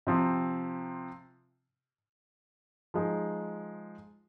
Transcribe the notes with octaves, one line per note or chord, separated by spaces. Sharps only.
C3 F3 C4
F3 G#3 D#4